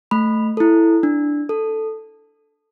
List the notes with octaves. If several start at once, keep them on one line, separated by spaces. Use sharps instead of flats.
A3 B5
E4 A4
D4
A4